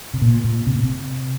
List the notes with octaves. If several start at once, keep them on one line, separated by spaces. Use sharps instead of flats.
C3
A#2
A#2
C3
A#2
C3